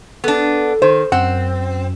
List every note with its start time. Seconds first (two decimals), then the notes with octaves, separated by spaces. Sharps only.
0.24 B3 D4 A4
0.82 D#3 C5
1.12 F#2 C4 F#5